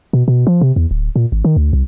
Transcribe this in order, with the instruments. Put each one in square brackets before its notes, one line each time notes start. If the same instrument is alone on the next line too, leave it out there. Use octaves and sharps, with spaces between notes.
[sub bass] B2
B2
F3
C3
E2
D1
A#2
G#1
D#3
D2
C2